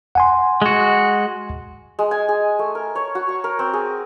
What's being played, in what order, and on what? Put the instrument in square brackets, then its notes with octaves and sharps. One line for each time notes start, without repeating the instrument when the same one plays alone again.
[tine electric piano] F#5 G#5 C6
[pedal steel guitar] G#3 F#4
[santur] G#3
G#5
G#4
A3
A#4
C#5
F#4
C#6
A#4
C4
G#4